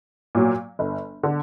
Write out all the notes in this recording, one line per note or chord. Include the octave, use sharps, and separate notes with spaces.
A#2 F#3
G1
D3